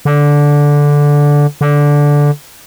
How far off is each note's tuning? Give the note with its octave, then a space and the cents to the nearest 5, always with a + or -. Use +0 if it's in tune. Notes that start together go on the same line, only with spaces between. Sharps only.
D3 -10
D3 -10